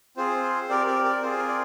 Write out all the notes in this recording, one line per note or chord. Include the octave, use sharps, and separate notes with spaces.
C4 F4 G#4 C5
C4 G4 A#4 D5
A#4 D5
A#4 D5
C4 F4 G#4 C5
A#4
D5